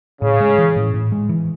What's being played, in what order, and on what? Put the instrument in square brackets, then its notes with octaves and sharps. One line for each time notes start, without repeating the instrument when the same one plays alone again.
[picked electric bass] A2 [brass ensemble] C#3
[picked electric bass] G#3
E3
A2
A2
G#3
E3